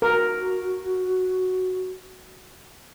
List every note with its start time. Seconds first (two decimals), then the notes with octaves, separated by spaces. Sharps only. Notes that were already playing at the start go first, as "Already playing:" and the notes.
0.02 F#4 A#4